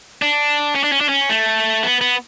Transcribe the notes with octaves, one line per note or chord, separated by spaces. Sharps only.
D4
C#4
D4
C#4
D4
C#4
A3
B3
B3